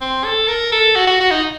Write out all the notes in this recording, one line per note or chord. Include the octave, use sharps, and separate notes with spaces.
C4
A4
A#4
A4
F#4
F#4
F#4
D#4